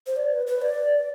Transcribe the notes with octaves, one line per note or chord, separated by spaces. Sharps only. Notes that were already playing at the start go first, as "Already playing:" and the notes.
C5
D5
B4
B4
D5